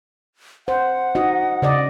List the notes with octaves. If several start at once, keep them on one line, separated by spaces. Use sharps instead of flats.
C5 F#5
D#4 F#4 D#5
C#3 D5 D#5